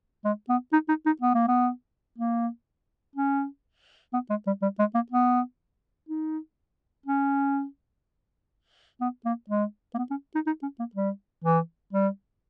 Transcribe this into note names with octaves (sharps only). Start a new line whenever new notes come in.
G#3
B3
D#4
D#4
D#4
B3
A#3
B3
A#3
C#4
B3
G#3
G3
G3
G#3
A#3
B3
D#4
C#4
B3
A#3
G#3
A#3
B3
C#4
D#4
D#4
C#4
A#3
G3
E3
G3